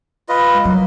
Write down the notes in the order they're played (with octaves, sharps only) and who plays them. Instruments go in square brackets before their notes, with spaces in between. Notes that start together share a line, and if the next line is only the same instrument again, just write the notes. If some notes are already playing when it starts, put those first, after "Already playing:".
[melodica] F4 B4 D#5
[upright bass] G#3
[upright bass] F#3 [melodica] A#3